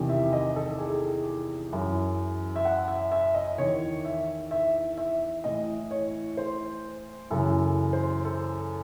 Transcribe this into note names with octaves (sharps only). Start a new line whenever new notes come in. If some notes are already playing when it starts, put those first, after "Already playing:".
Already playing: E2 C3 D#3
E5
D#5
A4
G#4
F#2 E3
E5
F#5
E5
E5
D#5
E2 D#3 C#5
E5
E5
E5
A2 E3 D#5
C#5
C5
F#2 C#3 E3 A4
C5
A4